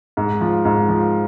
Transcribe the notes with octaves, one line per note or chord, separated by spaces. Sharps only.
G#2
F3
G#2
F3